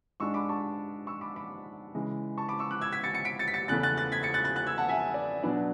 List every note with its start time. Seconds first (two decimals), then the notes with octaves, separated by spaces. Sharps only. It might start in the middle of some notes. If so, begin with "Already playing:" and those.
0.20 G#2 G#3 D4 C#6 E6
0.34 B5 D6
0.49 A5 C#6
1.07 C#6 E6
1.21 B5 D6
1.36 B5 D6
1.95 C#3 E3 G#3
2.38 A5 C#6
2.48 B5 D6
2.59 C#6 E6
2.71 D6 F#6
2.81 E6 G#6
2.93 G#6 B6
3.04 A6 C#7
3.14 A6 C#7
3.25 B6 D7
3.39 A6 C#7
3.48 B6
3.54 A6 C#7
3.68 E2 C#3 E3 A3 C#4 F#6 A6
3.83 F#6 A6
3.97 F#6 A6
4.12 G#6 B6
4.23 A6 C#7
4.34 F#6 A6
4.44 F#6 A6
4.56 F#6 A6
4.67 E6 G#6
4.78 F#5 A5
4.89 E5 G#5
5.14 D5
5.43 B2 F#3 B3 D4 D5